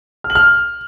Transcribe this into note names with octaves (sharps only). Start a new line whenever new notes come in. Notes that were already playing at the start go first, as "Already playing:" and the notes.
F6
F#7
F6